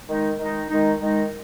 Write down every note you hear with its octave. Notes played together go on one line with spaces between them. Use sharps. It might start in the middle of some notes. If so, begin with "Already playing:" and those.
D#3 G#3 D#4
D#3 G#3 D#4
D#3 G#3 D#4
D#3 G#3 D#4